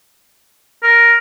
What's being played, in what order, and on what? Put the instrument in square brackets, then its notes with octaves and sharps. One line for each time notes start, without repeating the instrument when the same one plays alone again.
[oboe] A#4